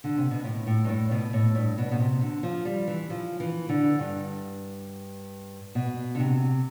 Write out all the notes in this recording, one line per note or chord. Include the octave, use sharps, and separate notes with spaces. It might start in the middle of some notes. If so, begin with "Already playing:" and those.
D3
C3
B2
A2
A2
G2
A2
B2
A2
G2
B2
B2
C3
D3
F3
G3
E3
F3
E3
D3
G2
B2
D3
C3